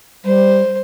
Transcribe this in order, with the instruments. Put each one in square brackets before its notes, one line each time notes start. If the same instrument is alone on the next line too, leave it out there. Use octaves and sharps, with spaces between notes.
[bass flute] G3 [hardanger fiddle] C5